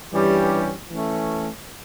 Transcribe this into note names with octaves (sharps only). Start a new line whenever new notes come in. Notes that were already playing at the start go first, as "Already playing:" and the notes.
G2 E3 G3 C#4 G4
E3 A3 C#4